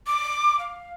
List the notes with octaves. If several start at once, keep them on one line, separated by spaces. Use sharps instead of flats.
D6
F5